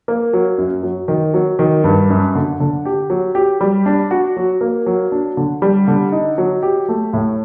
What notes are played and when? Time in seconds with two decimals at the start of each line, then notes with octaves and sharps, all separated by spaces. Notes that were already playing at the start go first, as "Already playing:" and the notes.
0.08 A#3
0.33 F#3
0.58 F#2
0.83 F#3
1.08 D#3
1.34 F#3
1.59 D#3
1.84 G2
2.10 F#2
2.35 D3
2.60 D3
2.85 G4
3.10 F#3
3.35 G4
3.61 G3
3.86 D4
4.11 F#4
4.36 F#3
4.61 A#3
4.86 F#3
5.12 D4
5.37 D3
5.62 G3
5.88 D3
6.12 D#4
6.38 F#3
6.63 G4
6.88 A3
7.13 A2